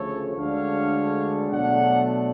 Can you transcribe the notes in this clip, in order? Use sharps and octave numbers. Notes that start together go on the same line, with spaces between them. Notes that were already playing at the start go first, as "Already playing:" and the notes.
Already playing: D2 C#3 F3 A3 A4 C#5
D2 D3 G#3 D4 C#5 F5
B2 F#3 A3 D4 D5 F#5